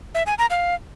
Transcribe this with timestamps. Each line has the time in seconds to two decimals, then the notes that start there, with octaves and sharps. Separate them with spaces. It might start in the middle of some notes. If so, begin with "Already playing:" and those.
0.15 E5
0.26 G#5
0.38 A#5
0.50 F5